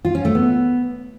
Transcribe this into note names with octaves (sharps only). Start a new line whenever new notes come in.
F4
C#4
A3
B3